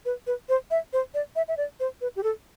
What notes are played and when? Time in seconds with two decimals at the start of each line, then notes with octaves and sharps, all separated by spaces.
0.05 B4
0.27 B4
0.49 C5
0.71 E5
0.93 C5
1.14 D5
1.36 E5
1.48 E5
1.57 D5
1.80 C5
2.01 B4
2.16 G4
2.23 A4